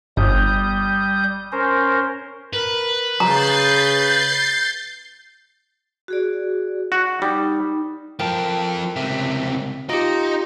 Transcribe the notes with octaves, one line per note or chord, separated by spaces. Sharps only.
G1 G3 D#6 G6
C#4 A#4 C5
A#4 B4
C#3 A#5 G6 A6 C7
F#4 G#4 D5
F#4
G3 D#4
F3 A4 A#4 G5
C#2 C3
D#4 F4 G4